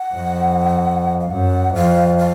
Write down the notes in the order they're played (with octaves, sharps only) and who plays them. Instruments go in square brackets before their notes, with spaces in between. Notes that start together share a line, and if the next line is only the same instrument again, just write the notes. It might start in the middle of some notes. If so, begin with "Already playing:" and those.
Already playing: [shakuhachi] F#5
[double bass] F2
[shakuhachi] F5
[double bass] F#2 [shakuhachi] F#5
[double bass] F2 [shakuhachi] F5
[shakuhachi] F5